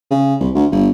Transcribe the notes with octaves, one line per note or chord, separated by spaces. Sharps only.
C#3
C2
D2
G1